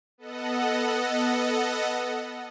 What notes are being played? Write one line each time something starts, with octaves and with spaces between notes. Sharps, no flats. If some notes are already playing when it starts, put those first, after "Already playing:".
B3 A4 D#5 F#5